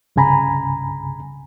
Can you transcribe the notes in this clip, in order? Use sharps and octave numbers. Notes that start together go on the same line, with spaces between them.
C2 G2 C#3 G#5 A#5 B5